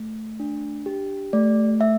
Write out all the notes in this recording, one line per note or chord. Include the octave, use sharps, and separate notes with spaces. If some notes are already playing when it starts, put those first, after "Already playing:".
Already playing: A3
D4
G4
A3 D5
A3 E5